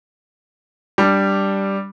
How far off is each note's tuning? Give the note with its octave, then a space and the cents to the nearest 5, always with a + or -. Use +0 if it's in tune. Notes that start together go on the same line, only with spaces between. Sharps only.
G3 +0 D4 +0